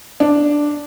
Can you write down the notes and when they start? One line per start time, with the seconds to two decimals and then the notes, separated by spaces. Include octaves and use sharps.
0.20 D4